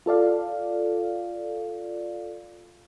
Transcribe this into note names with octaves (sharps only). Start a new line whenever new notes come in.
F4 A4 D5 F5